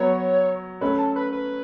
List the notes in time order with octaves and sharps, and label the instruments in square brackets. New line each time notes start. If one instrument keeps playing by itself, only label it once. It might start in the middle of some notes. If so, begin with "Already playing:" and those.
Already playing: [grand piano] F#3 B3 [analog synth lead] C#5
[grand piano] A3 C#4 [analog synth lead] B4
[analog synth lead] A4
B4
B4